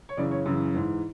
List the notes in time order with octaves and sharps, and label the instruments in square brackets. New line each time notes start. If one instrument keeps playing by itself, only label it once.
[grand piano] C#5
F#2 C#3 E3 D5
C#5
F#2 C#3 E3
G#2 E3